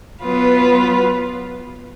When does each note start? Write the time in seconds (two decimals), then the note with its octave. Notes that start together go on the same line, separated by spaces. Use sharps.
0.22 F#3 B3 F4 B4